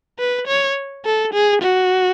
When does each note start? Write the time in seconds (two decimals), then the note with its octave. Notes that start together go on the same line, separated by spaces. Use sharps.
0.19 B4
0.48 C#5
1.05 A4
1.34 G#4
1.62 F#4